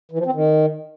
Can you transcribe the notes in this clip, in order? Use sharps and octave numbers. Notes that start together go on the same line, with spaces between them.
E3
F3
C4
D#3